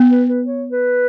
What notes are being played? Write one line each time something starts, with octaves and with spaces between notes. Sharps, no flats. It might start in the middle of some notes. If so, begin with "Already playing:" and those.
Already playing: B3
B4
B4
C#5
B4